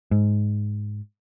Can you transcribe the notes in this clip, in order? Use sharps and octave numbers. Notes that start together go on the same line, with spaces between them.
G#2